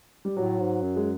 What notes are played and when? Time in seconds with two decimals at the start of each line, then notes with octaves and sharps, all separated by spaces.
0.25 G3
0.37 A2 F#3
0.60 G#2
0.83 F#2
0.96 G#3